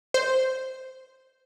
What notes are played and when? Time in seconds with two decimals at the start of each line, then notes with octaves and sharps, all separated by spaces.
0.14 C5